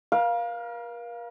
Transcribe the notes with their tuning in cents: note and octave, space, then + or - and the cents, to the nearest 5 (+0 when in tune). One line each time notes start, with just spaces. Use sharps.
A#4 +40 F5 +0